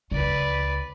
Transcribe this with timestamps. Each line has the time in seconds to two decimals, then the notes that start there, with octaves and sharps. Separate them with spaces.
0.11 C#2 B4 D5